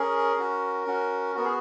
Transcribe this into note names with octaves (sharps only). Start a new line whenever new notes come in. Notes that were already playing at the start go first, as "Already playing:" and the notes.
Already playing: C#4 G#4 A#4
C#4 F#4
C#4 F#4
B3 F#4 A#4
G#4